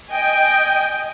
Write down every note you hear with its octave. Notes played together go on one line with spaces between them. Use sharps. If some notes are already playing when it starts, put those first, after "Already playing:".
D#5 G5 G#5